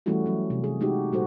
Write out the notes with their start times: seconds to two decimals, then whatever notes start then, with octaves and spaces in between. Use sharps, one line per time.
0.06 E3 G3 A3 C#4 E4 F#4
0.26 F#3 C#4
0.50 C3
0.64 G#4
0.81 G#3 A3 D#4 F#4 G4
1.12 A#2 G3 F#4 A4 C5